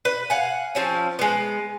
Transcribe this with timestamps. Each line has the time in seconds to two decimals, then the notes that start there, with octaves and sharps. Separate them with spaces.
0.05 B4
0.30 F5 F#5 G#5
0.75 F3 C4 C#4
1.19 G#3 B3